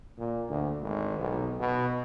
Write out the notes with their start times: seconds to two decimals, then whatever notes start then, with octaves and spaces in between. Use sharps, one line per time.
0.18 A#2
0.49 D2
0.82 G#1
1.19 B1
1.59 B2